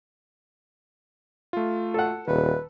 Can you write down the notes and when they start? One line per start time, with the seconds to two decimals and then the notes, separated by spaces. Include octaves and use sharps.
1.53 A3 F4
1.94 A4 F#5
2.27 D#1 D#3 B4